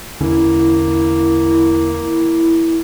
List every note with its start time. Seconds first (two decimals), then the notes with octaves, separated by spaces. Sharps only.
0.21 E2 D3 A#3 C#4 E4